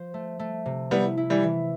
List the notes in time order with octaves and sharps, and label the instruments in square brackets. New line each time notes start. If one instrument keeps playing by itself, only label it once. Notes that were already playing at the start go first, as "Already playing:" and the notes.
Already playing: [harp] F3 C5
A3
A3
C3
[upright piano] G3 B3 [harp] E4
[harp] E4
[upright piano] E3 G3
[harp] E3